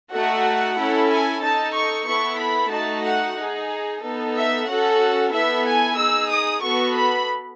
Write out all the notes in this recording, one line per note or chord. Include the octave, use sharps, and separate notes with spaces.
A3 D#4 F#4 A4 F#5
C#4 E4 A4
G#5
D#4 A4 A5
C#6
B3 E4 A4 C#6
B5
A3 D#4 F#4 A5
F#5
D#4 G#4
B3 D#4 A4
E5
C#4 F#4 A4 F#5
B3 E4 A4 E5
G#5
D#4 G#4 E6
D#6
B3 F#4 A4 C#6
B5